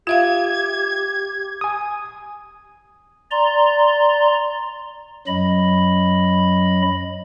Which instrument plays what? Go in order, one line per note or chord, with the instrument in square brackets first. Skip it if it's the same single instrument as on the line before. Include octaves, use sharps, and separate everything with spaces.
[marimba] F4 E5 F5 [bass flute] G4 [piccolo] G#6
[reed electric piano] G#5 D#6
[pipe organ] D5 A#5 C6
F#2 F#3 D#5 B5